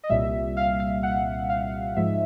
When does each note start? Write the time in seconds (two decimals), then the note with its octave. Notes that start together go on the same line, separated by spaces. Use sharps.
0.04 D#5
0.09 C2 A#2 G3 E5
0.57 F5
0.80 F5
1.03 F#5
1.49 F5
1.97 G#2 F3 G#3 E5